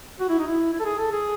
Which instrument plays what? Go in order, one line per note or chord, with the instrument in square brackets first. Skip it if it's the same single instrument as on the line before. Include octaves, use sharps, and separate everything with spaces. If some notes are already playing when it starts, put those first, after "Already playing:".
[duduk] F#4
E4
D#4
E4
E4
A4
G#4
A4
G#4